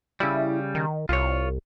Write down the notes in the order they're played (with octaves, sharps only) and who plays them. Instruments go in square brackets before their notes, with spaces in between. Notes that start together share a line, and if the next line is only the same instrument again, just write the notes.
[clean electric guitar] C#3 G3 [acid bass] E4
[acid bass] D#3
[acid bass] C2 [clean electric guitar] F4 C#5